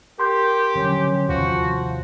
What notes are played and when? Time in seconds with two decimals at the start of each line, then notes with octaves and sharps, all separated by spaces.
0.19 G4 A#4 C6 G6
0.75 D3 F3 F#3 C#4
1.29 D#2 C3 F3 F#4